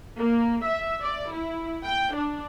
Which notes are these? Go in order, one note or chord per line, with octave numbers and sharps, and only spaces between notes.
A#3
E5
D5
E4
G5
D4